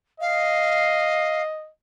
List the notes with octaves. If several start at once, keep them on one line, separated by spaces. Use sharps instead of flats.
D#5 F5